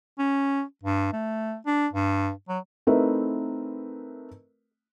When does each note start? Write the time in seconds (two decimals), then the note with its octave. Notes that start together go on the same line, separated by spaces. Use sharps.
0.19 C#4
0.83 G2
1.13 A3
1.66 D4
1.93 G2
2.49 F#3
2.87 A3 C4 D#4 E4 A#4 B4